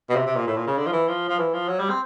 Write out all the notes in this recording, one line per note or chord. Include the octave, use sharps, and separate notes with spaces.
B2
C3
C3
A#2
A2
A#2
C#3
D3
F3
E3
F3
F3
E3
F3
F#3
G3
C4